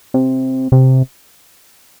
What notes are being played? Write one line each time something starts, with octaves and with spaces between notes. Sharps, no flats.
C3
C3